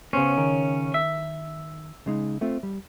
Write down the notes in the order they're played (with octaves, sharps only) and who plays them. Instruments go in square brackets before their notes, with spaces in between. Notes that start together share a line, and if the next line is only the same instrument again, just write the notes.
[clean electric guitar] C#3 C#4 [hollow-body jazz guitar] B3 C5
[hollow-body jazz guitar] D#3 A#4
[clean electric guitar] E5
[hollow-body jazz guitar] C#3 G#3 D#4
A3 C4 F4
G3